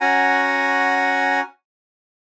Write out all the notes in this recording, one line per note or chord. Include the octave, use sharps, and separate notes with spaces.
C#4 F#4 F#5 G#5 A#5